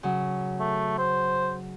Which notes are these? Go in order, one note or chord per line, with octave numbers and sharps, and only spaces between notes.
C#3 F#3
A3
C5